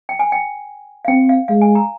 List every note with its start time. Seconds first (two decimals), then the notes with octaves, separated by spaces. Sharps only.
0.09 G5
0.19 G#5
0.32 G5
1.05 F5
1.08 C4 G5
1.29 F5
1.48 G#3 F5
1.61 G#5
1.75 A#5